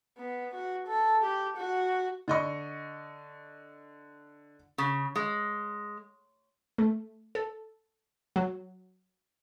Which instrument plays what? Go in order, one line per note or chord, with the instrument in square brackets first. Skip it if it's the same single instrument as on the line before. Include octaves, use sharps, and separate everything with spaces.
[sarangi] B3
F#4
A4
G4
F#4
[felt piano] D3 D#5 C#6
[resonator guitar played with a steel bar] C#3
G#3
[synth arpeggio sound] A3
A4
F#3